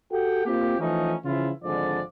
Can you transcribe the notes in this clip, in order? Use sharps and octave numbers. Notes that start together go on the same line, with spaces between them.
F#4 G4 A4 F#5 G5
A#3 C4 F4 G4
E3 F3 A3 C#4 D#4
C#3 E3 F3 E4 F4
G#1 D3 F3 G#3 D5